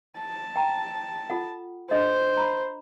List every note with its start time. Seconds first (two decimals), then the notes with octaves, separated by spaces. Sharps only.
0.18 A5
0.56 G5 A#5
1.30 F4 A4 F#5
1.91 D4 A4 C5 D#5
2.37 A#5 B5